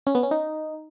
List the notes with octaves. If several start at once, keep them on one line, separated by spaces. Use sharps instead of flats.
C#4
B3
C#4
D#4